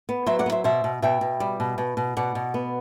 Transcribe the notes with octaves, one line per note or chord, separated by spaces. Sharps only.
B3
F#3 C5 E5
D5 F#5
B3
C5 E5
B2 C5 E5
B2
B2 E5 G5
B2
G3
B2
B2
B2
B2 D5 F#5
B2
B3